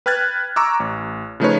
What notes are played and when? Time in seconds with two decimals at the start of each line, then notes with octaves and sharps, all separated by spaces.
0.06 B4 G5 F6 F#6 G#6 A6
0.56 A#5 C#6 D6 E6
0.80 A1
1.40 C#3 F3 A3 D#4 B4 C#5